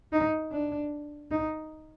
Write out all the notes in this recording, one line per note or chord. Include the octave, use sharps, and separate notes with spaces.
D#4
D4
D#4